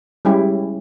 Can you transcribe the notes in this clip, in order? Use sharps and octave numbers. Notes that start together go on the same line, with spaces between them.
G3 G#3 C#4 E4 G4 G#4